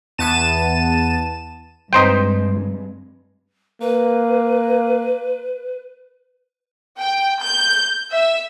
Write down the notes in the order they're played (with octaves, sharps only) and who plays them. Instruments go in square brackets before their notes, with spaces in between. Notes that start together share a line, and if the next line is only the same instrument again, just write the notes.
[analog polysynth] E2 B3 A5 D#7 E7
[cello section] G2 G#3 [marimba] C4 B4 [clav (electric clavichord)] D#4 C5 G5
[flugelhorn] A#3 [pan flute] B4
[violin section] G5
G6
E5